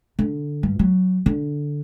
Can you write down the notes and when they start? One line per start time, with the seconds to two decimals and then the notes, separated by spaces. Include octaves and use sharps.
0.19 D3
0.63 G2
0.79 F#3
1.26 D3